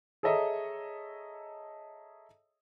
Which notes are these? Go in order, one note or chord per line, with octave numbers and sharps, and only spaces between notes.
G#4 A4 C#5 D#5 E5 A#5